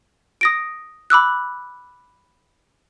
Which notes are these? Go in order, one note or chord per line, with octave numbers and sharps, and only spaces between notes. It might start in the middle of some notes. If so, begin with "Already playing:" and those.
D#6 A#6 D7
B5 D6 E6 F#6